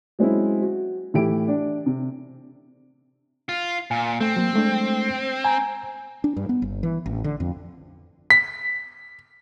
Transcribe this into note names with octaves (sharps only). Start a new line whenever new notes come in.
F#3 G#3 C4 C#4 E4
F#4
A2 E3 E4 G4 D7
D4
C3
F4
A#2 G#5
A3 C4
F#3 A#3
G#3 A3 D4
G#5 A#5
D4
G2
B3
G1
E3
A1
D3
F2
B6